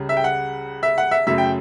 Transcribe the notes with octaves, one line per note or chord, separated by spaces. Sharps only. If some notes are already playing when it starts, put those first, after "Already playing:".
Already playing: C#2 C#3 G3
E5
G5
F#5
E5
F#5
E5
F#2 C#3 F#3 A3 E5
G5